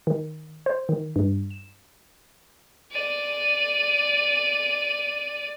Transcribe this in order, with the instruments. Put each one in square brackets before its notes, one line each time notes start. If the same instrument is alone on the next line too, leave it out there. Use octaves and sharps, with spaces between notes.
[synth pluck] D#3
C5
D#3
G2
E7
[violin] D5 D#7